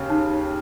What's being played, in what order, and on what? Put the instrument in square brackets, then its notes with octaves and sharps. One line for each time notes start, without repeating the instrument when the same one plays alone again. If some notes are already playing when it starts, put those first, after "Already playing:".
Already playing: [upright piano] D#2 C#3
[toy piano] D#4